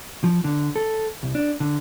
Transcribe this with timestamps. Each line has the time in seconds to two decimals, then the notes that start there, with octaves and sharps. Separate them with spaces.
0.24 F3
0.44 D3
0.76 A4
1.23 C2
1.35 D4
1.60 D3